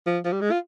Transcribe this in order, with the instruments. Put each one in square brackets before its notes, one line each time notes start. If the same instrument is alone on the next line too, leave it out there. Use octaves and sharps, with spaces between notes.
[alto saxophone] F3
F3
G3
G#3
F4